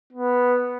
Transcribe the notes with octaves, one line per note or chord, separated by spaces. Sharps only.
B3